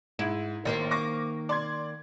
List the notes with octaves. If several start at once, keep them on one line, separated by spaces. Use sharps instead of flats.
G#2 E4
A1 D#3 A#3 C5
C#6 D6 A#6
D5 C6 G#6